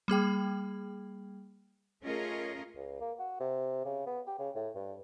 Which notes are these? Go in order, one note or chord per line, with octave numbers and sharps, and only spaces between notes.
G3 A#3 G#4 G5
A3 C#4 F4 G#4 A#4 D#5
C#2
A#3
F#4
C3
C#3
B3
G4
C#3
A2
G2